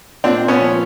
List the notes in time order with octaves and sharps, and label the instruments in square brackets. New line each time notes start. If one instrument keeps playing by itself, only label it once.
[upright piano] A#2 [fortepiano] C4 D4
[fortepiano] B3 C#4
[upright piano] F3